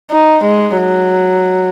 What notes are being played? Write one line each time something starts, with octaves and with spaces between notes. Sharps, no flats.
D#4
G#3
F#3